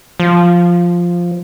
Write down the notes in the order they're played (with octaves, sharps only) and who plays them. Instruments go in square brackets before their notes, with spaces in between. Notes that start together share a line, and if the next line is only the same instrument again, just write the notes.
[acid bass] F3